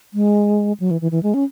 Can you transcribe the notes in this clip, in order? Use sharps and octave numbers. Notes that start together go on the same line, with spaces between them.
G#3
F#3
E3
E3
E3
G#3
C#4